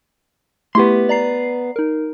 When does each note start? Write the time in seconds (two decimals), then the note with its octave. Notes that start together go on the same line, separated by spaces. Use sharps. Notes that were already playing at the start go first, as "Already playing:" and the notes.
0.75 A3 B3 E4 G4 C6
1.09 D5 A#5 C7
1.76 D#4 A#4